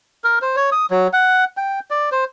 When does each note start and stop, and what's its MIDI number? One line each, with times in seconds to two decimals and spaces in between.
0.24 0.39 70
0.42 0.56 72
0.56 0.70 73
0.72 0.86 87
0.90 1.07 54
1.13 1.44 78
1.57 1.79 79
1.91 2.10 74
2.12 2.24 72